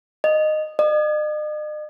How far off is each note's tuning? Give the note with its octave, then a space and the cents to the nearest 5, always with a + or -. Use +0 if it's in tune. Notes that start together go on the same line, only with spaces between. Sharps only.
D#5 -10
D#5 -45